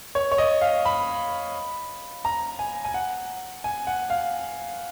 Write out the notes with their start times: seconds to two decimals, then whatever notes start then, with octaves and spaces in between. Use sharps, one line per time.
0.15 C#5
0.32 C#5
0.38 D#5
0.61 F5
0.85 B5
2.25 A#5
2.59 G#5
2.85 G#5
2.94 F#5
3.64 G#5
3.87 F#5
4.10 F5